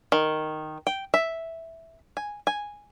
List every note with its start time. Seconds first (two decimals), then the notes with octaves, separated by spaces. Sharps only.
0.12 D#3
0.87 G5
1.14 E5
2.17 G#5
2.47 G#5